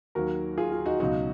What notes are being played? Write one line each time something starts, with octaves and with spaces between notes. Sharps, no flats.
D#2 D#3 F#3 F#4 A#4
F4 G#4
F4
D#4 F#4
C#2 B2 F#3 D#4 F#4